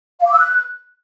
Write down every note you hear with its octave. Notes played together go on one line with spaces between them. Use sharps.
F5
D6
E6
F#6